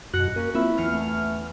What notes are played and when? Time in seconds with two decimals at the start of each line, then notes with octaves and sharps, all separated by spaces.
0.13 F#2 B2 F#4 F#6 A#6 C#7
0.36 A#3 C#4 A#4
0.55 A#3 C4 E4 F4 E5
0.78 E2 F6 C#7
0.92 A3